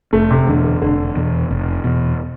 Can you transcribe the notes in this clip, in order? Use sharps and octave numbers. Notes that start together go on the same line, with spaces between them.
F1 A3
C3
E2 B2 D3
D3
F1 D3
E2 B2
F1
E2 B2